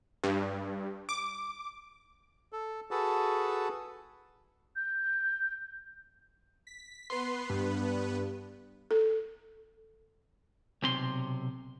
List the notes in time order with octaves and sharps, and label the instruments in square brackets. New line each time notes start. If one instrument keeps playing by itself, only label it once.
[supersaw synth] G2
D6
[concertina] A4
F#4 G#4 A4 B4 A5
[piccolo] G6
[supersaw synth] B6
[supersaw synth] B3 B4 [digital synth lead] C6
[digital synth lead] G2
[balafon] A4
[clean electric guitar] B1 C3 C6